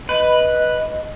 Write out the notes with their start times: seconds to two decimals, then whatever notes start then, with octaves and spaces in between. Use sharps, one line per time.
0.09 B4 D#5